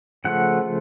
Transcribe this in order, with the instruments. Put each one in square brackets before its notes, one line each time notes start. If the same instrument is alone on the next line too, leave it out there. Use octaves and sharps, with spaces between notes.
[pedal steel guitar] C#3 F3 A3 F#5